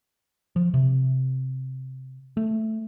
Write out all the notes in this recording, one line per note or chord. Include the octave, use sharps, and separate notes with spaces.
F3
C3
A3